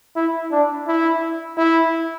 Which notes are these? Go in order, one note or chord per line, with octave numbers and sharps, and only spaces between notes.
E4
D4
E4
E4